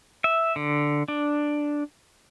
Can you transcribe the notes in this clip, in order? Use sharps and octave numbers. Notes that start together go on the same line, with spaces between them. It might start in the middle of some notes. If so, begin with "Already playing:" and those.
E5
D3
D4